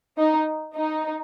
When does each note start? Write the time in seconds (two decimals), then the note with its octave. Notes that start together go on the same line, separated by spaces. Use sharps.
0.19 D#4
0.76 D#4